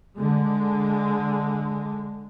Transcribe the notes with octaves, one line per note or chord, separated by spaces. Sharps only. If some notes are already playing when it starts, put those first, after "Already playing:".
D3 G#3